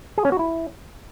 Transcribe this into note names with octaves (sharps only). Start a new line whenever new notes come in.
G#4
C#4
F#4
E4